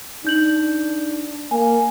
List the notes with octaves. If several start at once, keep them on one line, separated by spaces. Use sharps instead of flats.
D4 D#4 G6 F#7
A#3 G#5